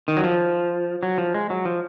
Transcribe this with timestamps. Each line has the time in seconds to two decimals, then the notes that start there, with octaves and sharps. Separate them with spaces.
0.08 D#3
0.17 F#3
0.24 F3
1.03 F#3
1.18 F3
1.34 G#3
1.50 F#3
1.65 F3